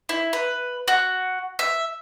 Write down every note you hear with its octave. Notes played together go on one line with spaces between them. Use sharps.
E4
B4
F#4
E5